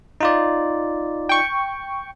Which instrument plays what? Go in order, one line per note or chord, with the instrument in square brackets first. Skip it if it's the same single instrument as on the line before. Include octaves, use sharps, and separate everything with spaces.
[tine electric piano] D#4 F4 D5
[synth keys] G5 C#6